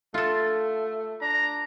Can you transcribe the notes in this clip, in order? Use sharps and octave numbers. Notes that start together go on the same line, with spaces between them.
A3 F4 A4
D4 A#5